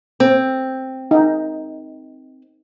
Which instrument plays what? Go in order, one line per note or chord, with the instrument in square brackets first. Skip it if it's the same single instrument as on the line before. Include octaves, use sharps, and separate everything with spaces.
[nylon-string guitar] C4
[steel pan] D#4